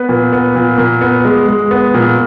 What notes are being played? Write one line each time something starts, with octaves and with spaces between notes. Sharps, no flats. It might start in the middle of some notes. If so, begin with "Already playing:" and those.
Already playing: B3 B4
A#2
B3
A#2
A#2
B3
G#3
G#3
B3
A#2